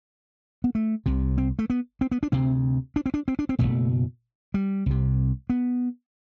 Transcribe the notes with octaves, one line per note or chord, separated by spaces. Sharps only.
B3
A3
C2 C3
C4
A3
B3
C4
B3
D4
D2 C3 C4
D4
C4
D4
C4
D4
C4
F#1 E2 B2 A3
G3
C2 C3
B3